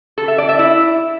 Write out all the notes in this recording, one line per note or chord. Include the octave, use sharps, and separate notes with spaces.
A4
E5
D5
E5
E4